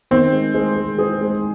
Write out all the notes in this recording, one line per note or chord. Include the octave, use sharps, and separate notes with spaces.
D#3 C4
G#3
G#3
G#3
G#4
G#3